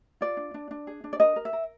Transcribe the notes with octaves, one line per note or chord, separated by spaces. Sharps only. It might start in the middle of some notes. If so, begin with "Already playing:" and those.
F4 D5
D4
D4
D4
G#4
D4
D5
A#4 D#5
A#4
E5
A#4